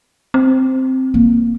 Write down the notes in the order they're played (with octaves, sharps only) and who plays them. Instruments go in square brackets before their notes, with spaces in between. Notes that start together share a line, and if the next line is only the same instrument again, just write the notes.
[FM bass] C4
[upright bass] A#3